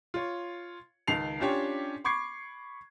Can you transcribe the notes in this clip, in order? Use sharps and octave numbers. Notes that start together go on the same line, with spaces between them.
F4 C#5
C#2 D#3 A5 C7 F7
C#4 D4 F4 G4 C#5
B5 C#6 D6 G#6 C7